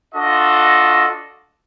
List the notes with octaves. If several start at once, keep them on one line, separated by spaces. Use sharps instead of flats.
D4 F4 F#4 A4 D#5